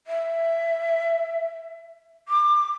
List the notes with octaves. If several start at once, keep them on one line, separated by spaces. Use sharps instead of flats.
E5
D6